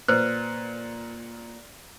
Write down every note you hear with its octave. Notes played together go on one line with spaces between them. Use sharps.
A#2 B4 C5 F#6